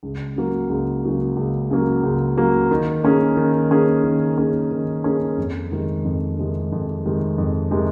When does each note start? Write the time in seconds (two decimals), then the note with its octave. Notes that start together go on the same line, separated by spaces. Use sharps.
0.03 C#2
0.36 C#3 F#3 A#3
0.69 C#2
1.04 C#3 F#3 A#3
1.37 C#2
1.71 C#3 F#3 A#3
2.03 C#2
2.37 C#3 F#3 A#3
2.71 D#3
3.04 A#3 C#4 G#4
3.37 D#3
3.71 A#3 C#4 G#4
4.04 D#3
4.37 A#3 C#4 G#4
4.71 D#3
5.04 A#3 C#4 G#4
5.38 F2
5.71 C3 D#3 G#3
6.05 F2
6.39 C3 D#3 G#3
6.72 F2
7.05 C3 D#3 G#3
7.38 F2
7.71 C3 D#3 G#3